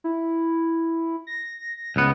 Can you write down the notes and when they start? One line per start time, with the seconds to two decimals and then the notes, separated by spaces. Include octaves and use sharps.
0.04 E4
1.27 A#6
1.96 C#2 B3